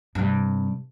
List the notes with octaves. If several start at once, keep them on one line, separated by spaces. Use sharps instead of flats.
G2 C3